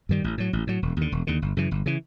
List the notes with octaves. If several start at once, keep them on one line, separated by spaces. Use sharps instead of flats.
G2 D#3 G3
A1
A2 F#3
A1
A2 F#3
E1
D#2 D3
E1
D#2 D3
G1
F#2 C#3 E3
G1
C#3 E3